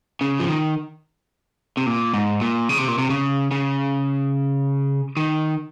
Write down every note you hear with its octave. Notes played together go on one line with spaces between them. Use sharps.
C#3
F3
D#3
C3
A#2
G#2
A#2
C#3
C3
A#2
C3
C#3
C#3
D#3